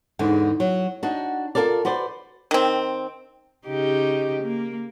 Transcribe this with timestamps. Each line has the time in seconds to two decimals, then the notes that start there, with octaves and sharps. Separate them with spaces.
0.19 E2 G#2 D3
0.60 F#3
1.03 D4 D#4 F#4
1.55 F4 F#4 A4 A#4 D5
1.85 F#4 B4 C5 D5
2.51 D#3 C4
3.67 C#3 D#4 G4
4.43 A#3